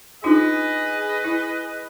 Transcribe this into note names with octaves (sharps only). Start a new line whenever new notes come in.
D4 D#4 F4 G#4 B4 D#5
E4